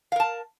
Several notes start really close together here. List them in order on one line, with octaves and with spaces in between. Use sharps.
F5 A#4 A5